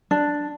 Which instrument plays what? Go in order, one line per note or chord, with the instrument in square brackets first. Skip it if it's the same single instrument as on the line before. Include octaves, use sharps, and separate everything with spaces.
[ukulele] D4